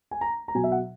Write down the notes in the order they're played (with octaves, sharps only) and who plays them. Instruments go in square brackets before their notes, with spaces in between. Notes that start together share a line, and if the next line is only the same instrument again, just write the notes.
[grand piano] G#5
A#5
A#5
B2 F#3 G#5
E5
F#5